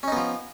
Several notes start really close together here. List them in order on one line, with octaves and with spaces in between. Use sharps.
C#4 D#4 B3 F3